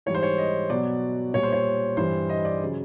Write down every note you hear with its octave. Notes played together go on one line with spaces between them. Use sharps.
G#2 E3 G3 C#5
C5
C#5
D#5
B2 F#3 D5
A#2 G3 C#5
C5
C#5
G2 E3 G3 C5
D#5
D5
C#3 F#3